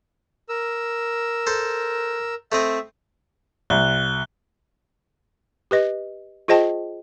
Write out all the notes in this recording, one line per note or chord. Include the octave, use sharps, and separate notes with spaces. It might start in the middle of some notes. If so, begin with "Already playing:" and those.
A#4 E6
A4 C5
A3 C4 D#5 E5
C2 F#6 G7
G4 B4 D#5
F4 G#4 C5 D#5 G5 A5